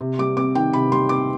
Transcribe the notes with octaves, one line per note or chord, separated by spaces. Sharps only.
C3
G3 D6
C4 D6
D#3 G5
C3 B5
G3 C6
C4 D6